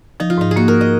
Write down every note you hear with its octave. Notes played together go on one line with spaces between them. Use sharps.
F3 D#4
F4
G#2 D#4
G#4
A#3 F#4
A#4
D#5